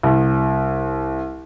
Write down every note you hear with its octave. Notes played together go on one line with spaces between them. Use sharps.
C2